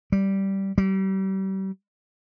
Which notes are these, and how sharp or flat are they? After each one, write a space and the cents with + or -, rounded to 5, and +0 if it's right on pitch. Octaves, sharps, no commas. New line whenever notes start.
G3 -10
G3 -35